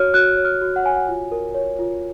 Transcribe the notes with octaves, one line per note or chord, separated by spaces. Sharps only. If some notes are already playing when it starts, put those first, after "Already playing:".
Already playing: F#4 C#5 F6
F#4 F#6
C#5
F6
F#4
F#5
C#5 G#5
F#5
F4 G#5
A#4
C#5
F4